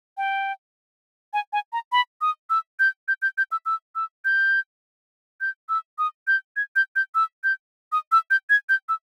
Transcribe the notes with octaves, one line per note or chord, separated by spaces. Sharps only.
G5
G#5
G#5
A#5
B5
D#6
E6
G6
G6
G6
G6
E6
E6
E6
G6
G6
E6
D#6
G6
G#6
G6
G6
E6
G6
D#6
E6
G6
G#6
G6
E6